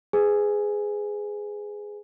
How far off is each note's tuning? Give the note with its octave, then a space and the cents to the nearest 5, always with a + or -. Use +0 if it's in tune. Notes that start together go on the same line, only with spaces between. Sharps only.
G#4 +0 B4 +40 G#5 +0